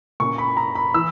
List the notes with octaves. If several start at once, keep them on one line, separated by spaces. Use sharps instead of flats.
A#2 A#3 C#4 C#6
B5
A#5
B5
E3 E6